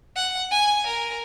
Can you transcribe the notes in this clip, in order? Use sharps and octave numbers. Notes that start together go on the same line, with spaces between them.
F#5
G#5
A#4